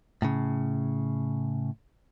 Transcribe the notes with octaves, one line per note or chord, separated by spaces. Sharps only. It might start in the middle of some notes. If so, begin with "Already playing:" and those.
A2 C#3